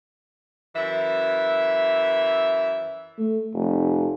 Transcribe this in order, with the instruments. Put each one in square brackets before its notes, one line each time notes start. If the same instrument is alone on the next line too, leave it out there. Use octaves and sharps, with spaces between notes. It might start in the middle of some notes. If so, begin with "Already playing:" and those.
[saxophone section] F#2 E3 E5
[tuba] A3
F1